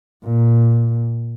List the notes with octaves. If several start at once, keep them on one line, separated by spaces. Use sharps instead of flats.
A#2